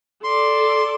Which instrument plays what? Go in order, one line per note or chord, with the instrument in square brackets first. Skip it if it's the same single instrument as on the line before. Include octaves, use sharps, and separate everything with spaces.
[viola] A4 D5 [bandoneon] C6